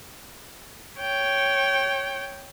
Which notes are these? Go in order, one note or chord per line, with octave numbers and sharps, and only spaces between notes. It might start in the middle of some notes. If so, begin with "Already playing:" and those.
C#5 G5